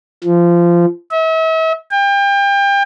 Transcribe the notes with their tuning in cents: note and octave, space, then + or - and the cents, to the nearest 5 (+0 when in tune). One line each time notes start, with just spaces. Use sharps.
F3 -20
E5 -40
G5 +30